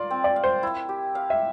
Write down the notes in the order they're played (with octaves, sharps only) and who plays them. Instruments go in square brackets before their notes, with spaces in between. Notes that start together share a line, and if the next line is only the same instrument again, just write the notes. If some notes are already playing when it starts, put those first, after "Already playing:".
Already playing: [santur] F4 A#4 F5 [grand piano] D5
[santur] C4
[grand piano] D5
[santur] F5
[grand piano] C5
[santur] E4
G4
F5
[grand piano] E5